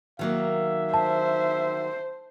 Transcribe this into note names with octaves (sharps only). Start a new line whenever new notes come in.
D#3 F#3 A#3 E5
C5 A5